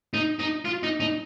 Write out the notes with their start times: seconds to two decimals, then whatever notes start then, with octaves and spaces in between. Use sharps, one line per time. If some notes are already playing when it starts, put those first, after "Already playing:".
0.14 D#4
0.39 D#4
0.65 F4
0.83 D#4
1.00 D#4